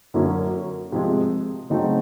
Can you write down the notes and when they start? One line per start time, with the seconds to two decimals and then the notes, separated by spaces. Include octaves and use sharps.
0.14 F#2 D3 F#3 A#3 C#4
0.92 C3 F3 G#3
1.70 C#3 F#3 A3 C4 D#4